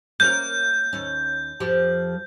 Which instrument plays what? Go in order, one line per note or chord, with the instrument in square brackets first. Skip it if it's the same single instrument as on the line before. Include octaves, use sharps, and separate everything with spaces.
[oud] A#3 C#4 A#4 [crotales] G6
[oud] D#2 C#4
F2 F3 G4